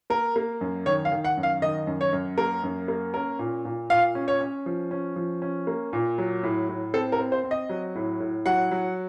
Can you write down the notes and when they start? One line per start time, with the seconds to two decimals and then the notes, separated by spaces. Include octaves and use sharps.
0.10 A#3 A#4
0.36 A#3
0.61 F#2
0.86 D#3 C#5
1.05 F5
1.12 D#3
1.24 F#5
1.37 F#2
1.43 F5
1.62 D#3 D#5
1.87 F#2
2.01 C#5
2.13 F#2
2.38 A#3 A#4
2.63 F#2
2.88 A#3
3.14 C#4 A#4
3.39 A#2
3.65 A#2
3.90 A#2 F5
4.15 C#4
4.28 C#5
4.41 C#4
4.66 F3
4.91 C#4
5.16 F3
5.42 C#4
5.67 A#3
5.93 A#2
6.18 F#3
6.43 A2
6.69 A2
6.94 C4 A4
7.12 A#4
7.19 C4
7.32 C5
7.44 C4
7.51 D#5
7.70 F#3
7.95 A2
8.20 A2
8.46 F#3 F#5
8.71 F#3